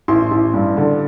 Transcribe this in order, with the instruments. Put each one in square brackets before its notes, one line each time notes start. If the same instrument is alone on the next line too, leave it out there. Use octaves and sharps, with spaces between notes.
[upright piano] A1 C6
A1
G2
D3